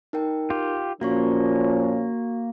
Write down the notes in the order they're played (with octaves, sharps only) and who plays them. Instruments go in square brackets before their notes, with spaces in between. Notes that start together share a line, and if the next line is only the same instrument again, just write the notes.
[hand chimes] D#4 A#4 G5
[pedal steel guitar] F4 G4
[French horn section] A#2 F3 C#4 [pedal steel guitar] A#3 [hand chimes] F#4 F5 C#6